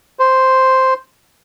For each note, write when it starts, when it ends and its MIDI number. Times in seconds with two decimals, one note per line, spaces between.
0.19 0.94 72